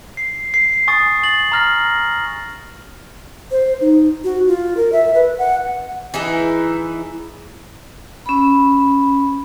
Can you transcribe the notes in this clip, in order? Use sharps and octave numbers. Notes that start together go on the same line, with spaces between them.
C7
C7
G#5 C#6 D#6 A6
A6 F#7
A#5 F6 A#6
C5
D#4
F#4
F4
A#4
E5
B4
F#5
E3 D#4 E4 G#4
C#4 B5